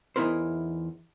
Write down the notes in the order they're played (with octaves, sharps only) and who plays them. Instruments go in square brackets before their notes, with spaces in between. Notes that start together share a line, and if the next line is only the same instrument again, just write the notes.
[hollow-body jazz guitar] E2 E3 D#4 E4 A#4 C5